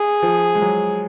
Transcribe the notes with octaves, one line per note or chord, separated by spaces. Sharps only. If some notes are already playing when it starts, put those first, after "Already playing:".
Already playing: G#4
F3
G#3
F#3